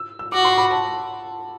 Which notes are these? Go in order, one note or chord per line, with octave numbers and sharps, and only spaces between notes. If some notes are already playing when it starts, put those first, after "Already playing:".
Already playing: E6
E6
F#4 D6
C6
B5
A5